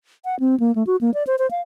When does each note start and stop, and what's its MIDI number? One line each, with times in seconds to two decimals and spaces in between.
0.25 0.39 78
0.40 0.58 60
0.60 0.74 58
0.75 0.86 57
0.87 0.96 66
1.01 1.13 58
1.14 1.23 74
1.27 1.36 72
1.39 1.49 72
1.51 1.61 77